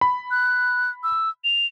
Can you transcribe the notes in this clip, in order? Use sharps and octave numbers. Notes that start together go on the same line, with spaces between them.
B5
F#6
E6
F7